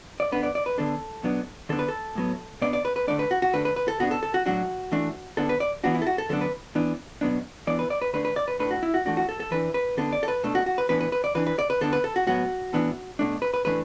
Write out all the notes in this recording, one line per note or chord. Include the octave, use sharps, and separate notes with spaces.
D5
D3 B3 D4 B4
D5
D5
B4
D3 B3 D4 A4
B2 F#3 B3 D4
D3 B3 D4 A4
B4
A4
A2 F#3 B3
B2 B3 D4 D5
D5
B4
B4
D3 A3 D4 D5
B4
F#4
F#4
D3 A3 D4 B4
B4
B4
A4
B2 B3 D4 F#4
A4
A4
F#4
A2 F#3 D4 F#4
E3 A3 D4
D3 B3 D4 A4
B4
D5
E3 B3 D4 F#4
E4
A4
F#4
A4
D3 F#3 B3 D4 A4
B4
E3 B3 D4
B2 F#3 B3 D4
E3 B3 D4 D5
B4
D5
B4
D3 A3 D4 B4
B4
D5
B4
A2 A3 D4 B4
F#4
E4
F#4
E3 A3 D4 F#4
F#4
A4
A4
E3 D4 B4
B4
D3 B3 D4 A4
D5
A4
B4
B2 A3 D4 A4
F#4
F#4
B4
A2 E3 B3 D4 B4
B4
B4
D5
E3 D4 B4
B4
D5
B4
D3 B3 D4 A4
B4
A4
F#4
A2 F#3 B3 F#4
A2 E3 B3 D4
B2 A3 D4
B4
B4
A2 E3 A3 D4 B4